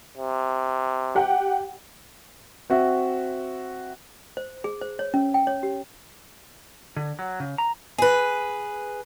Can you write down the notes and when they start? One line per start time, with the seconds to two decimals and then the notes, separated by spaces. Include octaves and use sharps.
0.17 C3
1.15 G4 F#5 G5
2.70 C4 F#4 E5
4.37 C5
4.64 G#4
4.81 C5
4.99 C#5
5.14 C#4
5.34 G5
5.47 C#5
5.63 G4
6.96 D3
7.19 F#3
7.40 C#3
7.58 A#5
7.98 G#4 B4